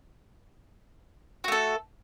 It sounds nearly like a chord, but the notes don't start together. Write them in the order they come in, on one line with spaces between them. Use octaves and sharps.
F#4 A3 A4